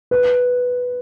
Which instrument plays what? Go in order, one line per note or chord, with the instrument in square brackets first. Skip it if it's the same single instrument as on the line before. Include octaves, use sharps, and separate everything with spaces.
[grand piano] B4